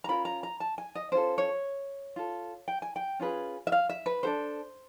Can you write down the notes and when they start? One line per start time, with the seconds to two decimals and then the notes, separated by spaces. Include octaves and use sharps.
0.04 A#5
0.08 C#4 F4 A#4 B5
0.25 A#5
0.43 A#5
0.60 A5
0.78 G#5
0.95 D#5
1.12 C#4 F4 A4 C5
1.38 C#5
2.16 F4 A4
2.68 G5
2.82 G#5
2.96 G5
3.19 C#4 F4 G#4 B4
3.67 E5
3.72 F5
3.89 E5
4.06 B4
4.23 D4 F#4 A4 C5